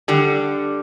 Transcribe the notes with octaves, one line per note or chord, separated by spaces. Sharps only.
D3 G3